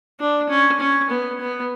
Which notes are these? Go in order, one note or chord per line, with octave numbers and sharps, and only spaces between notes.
D4
C#4
C#4
B3
B3